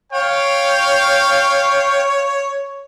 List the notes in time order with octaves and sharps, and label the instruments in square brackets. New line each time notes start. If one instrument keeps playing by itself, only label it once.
[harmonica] C#5 [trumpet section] F5 G5